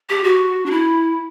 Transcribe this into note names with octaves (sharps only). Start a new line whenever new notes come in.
G4
F#4
D4
E4